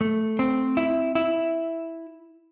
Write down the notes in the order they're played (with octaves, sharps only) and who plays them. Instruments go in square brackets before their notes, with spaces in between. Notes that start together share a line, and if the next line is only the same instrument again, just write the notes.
[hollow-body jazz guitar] A3
C4
E4
E4